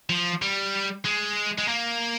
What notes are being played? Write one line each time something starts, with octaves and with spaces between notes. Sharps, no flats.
F3
G3
G#3
G#3
A#3